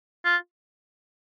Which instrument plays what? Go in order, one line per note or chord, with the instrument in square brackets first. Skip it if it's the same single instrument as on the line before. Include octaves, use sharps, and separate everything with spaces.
[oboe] F4